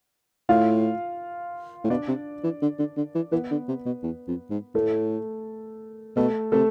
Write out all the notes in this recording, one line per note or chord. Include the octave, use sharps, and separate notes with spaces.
A2 F4 F5
A2
B2 D4 D5
C3
E3
D3
D3
D3
E3
E3 B3 B4
D3
C3
B2
E2
F2
G#2
A2 A3 A4
B2 A3 A4
C3 A3 A4